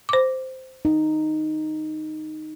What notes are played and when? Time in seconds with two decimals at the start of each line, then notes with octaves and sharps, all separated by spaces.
0.09 C5 D6
0.85 D#4